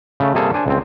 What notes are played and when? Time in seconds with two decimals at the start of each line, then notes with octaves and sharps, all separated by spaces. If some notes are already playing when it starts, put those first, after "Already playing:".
0.20 C#3 A3
0.34 C3 G3 A#3 G#4 A4
0.54 D4 C5 G#5
0.67 C#2 C4